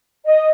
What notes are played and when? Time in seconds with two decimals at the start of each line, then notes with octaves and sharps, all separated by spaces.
0.24 D#5